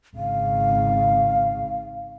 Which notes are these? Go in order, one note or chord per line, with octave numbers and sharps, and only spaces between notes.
G#1 C#3 F5